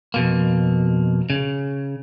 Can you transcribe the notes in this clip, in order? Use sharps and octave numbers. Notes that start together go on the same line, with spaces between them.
F2 B2 A#3
C#3